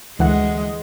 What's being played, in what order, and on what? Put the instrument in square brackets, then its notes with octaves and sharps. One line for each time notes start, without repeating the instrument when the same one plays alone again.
[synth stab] D2 E3 F#5 [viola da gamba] G#3